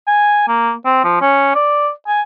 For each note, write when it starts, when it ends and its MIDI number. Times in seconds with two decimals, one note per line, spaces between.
0.07 0.46 80
0.48 0.73 58
0.85 1.01 60
1.04 1.20 53
1.21 1.52 61
1.55 1.90 74
2.07 2.21 80